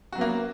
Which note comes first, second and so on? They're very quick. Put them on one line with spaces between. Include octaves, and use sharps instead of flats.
F#4 F#3 B3 A#3